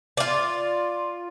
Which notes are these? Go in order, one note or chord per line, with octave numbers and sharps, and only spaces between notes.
F4 D5